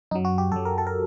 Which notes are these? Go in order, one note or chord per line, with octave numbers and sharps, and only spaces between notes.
F#2 F#3 D#4
F#4
G4
F#2 F#3 A4
A#4
A4
A#4